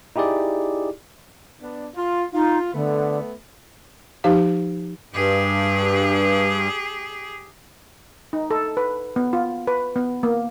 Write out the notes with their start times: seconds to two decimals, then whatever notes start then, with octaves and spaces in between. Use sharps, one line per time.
0.16 D#4 E4 G4 G#4 D5
1.61 B3 D4
1.95 F4
2.33 D#4 F4
2.74 D3 A3 B3
4.24 F3 D#4 G4 F5
5.14 G2 G4 G#4
8.33 D#4
8.51 A4
8.77 B4
9.16 B3
9.33 F4
9.67 B4
9.96 B3
10.23 A#3